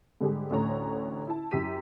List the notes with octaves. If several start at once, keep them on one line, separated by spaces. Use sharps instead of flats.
G#2 D3 G3 G4 G#4
A1 D2 A2 D3 C#5 A#5
E4 A5
F#2 E4 G4 E6 B6 D#7